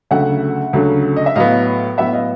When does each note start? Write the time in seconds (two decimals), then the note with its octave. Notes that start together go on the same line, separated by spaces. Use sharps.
0.11 D2 C#3 F#3 A3 E5 F#5
0.73 D2 C#3 F#3 A3
1.16 D#5
1.26 E5
1.36 A2 F#3 B3 D#5 F5
1.98 A2 F#3 B3 E5 F#5
2.13 D#5 F5